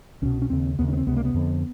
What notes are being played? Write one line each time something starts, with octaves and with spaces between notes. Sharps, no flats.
C2 B2 C#4
C#4
D#2 C#3 C4
D#2 C#3 B3
C#4
B3
C4
C#2 C3 B3
A#3
B3
F2 D3